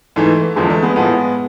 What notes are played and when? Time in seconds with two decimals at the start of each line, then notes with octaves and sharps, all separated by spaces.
0.16 G#2 E3 A3
0.56 E2 D3 F3 G#3
0.70 A3
0.83 G#3 B3
0.96 A2 F3 G#3 B3